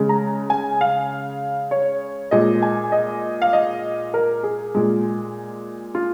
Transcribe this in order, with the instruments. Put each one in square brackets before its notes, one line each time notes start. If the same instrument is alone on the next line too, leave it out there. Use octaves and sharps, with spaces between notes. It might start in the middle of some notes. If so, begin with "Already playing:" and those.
Already playing: [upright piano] C#3 G#3
A#5
G#5
F5
C#5
A#2 G#3 D#5
G#5
D#5
F5
D#5
A#4
G#4
A#2 G#3
F4